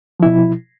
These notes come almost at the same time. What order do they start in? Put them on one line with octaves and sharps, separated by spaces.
F3 E4 B2